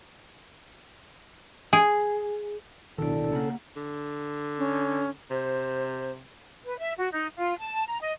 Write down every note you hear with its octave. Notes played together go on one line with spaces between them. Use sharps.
G#4
D1 B1 B2 D#3 D4 E4 A4 D5
C#3 A#3 C#4 F#5
D3
C#4
C3 C5
B4
E5
F#4
D#4
F4
A5
A#5
D#5